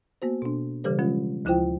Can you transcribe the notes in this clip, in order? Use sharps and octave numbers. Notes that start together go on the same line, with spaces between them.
A#3 B3 F#4 C5
B2 D4
C#3 E3 G3 G4 A4 C5
F3 G#3 C#4 F4
D2 F3 E4 F4 C5 G5